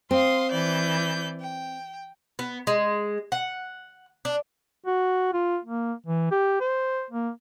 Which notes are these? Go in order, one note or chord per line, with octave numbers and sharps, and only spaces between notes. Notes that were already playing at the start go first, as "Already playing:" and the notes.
C4 F5 C6 D#6
E3 D5 G6
G5
B3
G#3
F#5
D4
F#4
F4
A#3
E3
G4
C5
A#3